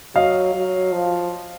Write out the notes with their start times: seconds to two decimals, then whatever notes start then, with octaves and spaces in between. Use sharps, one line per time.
0.15 F#3 D#5 F5
0.54 F#3
0.92 F3